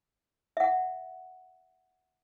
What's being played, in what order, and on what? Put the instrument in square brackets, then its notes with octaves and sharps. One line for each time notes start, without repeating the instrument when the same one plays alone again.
[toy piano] E5 F#5